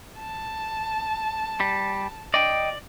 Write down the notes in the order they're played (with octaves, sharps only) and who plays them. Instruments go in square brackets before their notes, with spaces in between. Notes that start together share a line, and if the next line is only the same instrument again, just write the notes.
[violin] A5
[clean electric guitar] G3
[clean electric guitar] D5 [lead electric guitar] D#5 G5